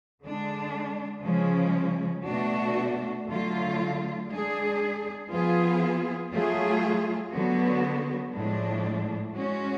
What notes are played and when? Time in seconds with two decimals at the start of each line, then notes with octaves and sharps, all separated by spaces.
0.23 D3 G#3 D4
1.24 C#3 F3 G#3 C#4
2.26 B2 A3 D4 F#4
3.27 D3 F#3 A3 F4
4.28 G#3 D4 G#4
5.30 F3 B3 F4 G#4
6.32 F#3 A3 F4 G#4
7.32 D3 F#3 B3 F#4
8.33 A2 F3 G#3 D4
9.34 G#3 C#4 F#4